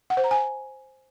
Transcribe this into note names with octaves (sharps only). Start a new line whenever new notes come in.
F#5
C5
A#5
G#5